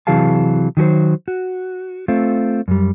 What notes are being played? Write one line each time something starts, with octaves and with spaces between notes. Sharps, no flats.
C3 E3 F#3 G#4 F5 A5
D#3 F#3 G4 C5
F#4
A3 C4 F4
F#2 G3